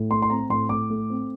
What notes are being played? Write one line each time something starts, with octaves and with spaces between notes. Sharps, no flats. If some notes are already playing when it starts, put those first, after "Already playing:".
Already playing: A2
A3 C6
C6
C4 A#5
A2 C6
A2 D6
A3
C4